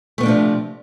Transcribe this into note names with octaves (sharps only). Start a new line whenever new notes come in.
C3 F3 A3 B3 D4